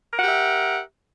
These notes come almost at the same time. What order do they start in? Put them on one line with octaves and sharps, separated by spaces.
A#4 F#5 G4 E5